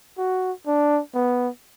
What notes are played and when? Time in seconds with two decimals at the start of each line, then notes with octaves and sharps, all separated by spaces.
0.18 F#4
0.67 D4
1.15 B3